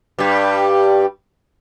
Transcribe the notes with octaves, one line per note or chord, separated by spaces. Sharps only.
G2 G3